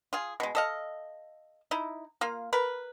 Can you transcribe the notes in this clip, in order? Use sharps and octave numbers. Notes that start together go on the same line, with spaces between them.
F4 G#4
B2 G#3
A4 D#5 F5
D#4 E4
A#3 F4
A#4 B4